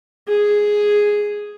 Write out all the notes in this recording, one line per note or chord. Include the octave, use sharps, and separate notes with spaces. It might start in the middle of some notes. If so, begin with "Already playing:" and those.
G#4